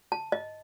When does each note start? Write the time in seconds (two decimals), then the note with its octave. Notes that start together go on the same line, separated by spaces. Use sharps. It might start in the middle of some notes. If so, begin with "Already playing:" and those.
0.12 A5
0.32 D#5